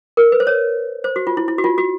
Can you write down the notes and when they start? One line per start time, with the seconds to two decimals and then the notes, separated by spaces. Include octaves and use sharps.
0.17 A#4
0.32 B4
0.40 C5
0.47 C#5
1.04 C5
1.16 F#4
1.27 F4
1.37 E4
1.48 E4
1.58 F#4
1.64 F4
1.78 F#4